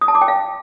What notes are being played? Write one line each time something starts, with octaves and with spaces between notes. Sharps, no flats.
D#6
A5
D6
G5
F5